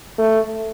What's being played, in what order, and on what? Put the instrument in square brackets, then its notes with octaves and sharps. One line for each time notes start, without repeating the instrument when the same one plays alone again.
[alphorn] A3